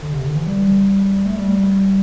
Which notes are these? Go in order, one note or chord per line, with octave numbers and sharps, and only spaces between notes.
D3
C3
D3
E3
G3
A3
G3